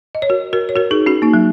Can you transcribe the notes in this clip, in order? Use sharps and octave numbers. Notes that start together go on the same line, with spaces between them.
D#5
C#5
F#4 A#4
F#4 A#4
C#5
F#4 A#4
D#4 G#4
C#4 F#4
A#3 D#4
F#3